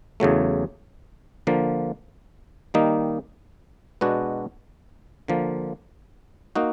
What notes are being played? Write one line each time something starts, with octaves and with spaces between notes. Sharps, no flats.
E2 C#3 F#3 A3
D3 F3 A#3
D#3 G3 A#3 D#4
B2 G#3 B3 D4 F#4
D3 F3 A#3
A#3 D#4 F#4